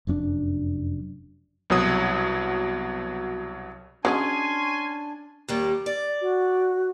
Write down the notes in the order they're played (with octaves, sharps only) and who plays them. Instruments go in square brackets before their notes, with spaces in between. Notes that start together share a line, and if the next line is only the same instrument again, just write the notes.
[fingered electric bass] F1 F#2 C#4 D4
[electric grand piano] C2 B2 F#3 D#6
[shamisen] F#3 G#3 G#4 [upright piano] C#4 [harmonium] D4 [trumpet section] G#5 C6
[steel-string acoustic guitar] D#2 G3 A#3
D5
[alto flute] F#4